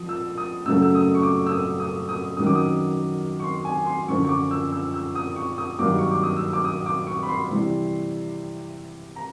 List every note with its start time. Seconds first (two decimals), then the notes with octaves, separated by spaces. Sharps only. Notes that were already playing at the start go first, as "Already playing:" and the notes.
Already playing: F3 D#6
0.09 E6
0.38 D#6
0.66 F#2 C#3 F#3 A3 E6
0.82 E6
0.95 D#6
1.15 C#6
1.23 D6
1.47 E6
1.51 D#6
1.80 D#6
2.09 D#6
2.37 F#2 D#3 F#3 D#6
2.46 D6
2.55 D#6
3.40 C#6
3.44 C6
3.65 G#5
3.86 C6
4.08 F#2 D3 F3 C#6
4.25 C#6
4.29 D6
4.51 E6
4.72 E6
4.94 E6
5.15 D#6
5.36 C#6
5.58 D#6
5.79 G2 D#3 F#3 A#3 D6
5.99 C#6
6.11 D6
6.23 D#6
6.36 E6
6.53 D6
6.65 D#6
6.86 D6
7.07 C#6
7.23 B5
7.29 C6
7.50 C3 E3 G3
9.16 A#5